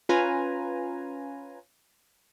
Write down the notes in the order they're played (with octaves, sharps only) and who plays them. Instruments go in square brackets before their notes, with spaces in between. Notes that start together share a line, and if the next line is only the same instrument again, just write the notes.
[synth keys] C#4 F4 B4 G#5 A#5